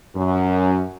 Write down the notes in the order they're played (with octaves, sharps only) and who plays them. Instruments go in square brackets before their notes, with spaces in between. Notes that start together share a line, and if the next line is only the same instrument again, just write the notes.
[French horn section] F#2